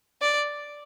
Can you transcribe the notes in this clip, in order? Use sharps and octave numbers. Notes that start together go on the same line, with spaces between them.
D5